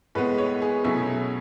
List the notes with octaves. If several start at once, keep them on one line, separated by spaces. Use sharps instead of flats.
A2 G#3 B3 B4
C#5
G#4
B2 F#3 A3 C#4 E4 G#4